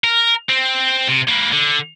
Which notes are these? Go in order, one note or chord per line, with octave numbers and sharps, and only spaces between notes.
A#4
C4
C3
A#3 B4
D3